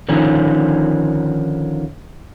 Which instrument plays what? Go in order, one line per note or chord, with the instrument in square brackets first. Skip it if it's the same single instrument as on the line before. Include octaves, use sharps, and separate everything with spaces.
[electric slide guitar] D3 D#3 F3 C#4